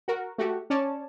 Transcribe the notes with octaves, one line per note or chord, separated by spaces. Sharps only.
F#4 A#4
A3 F#4 G4
C#4 C#5 D5 A5